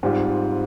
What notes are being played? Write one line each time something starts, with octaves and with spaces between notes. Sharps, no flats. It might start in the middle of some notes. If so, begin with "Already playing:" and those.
G#2 G3 C4 F4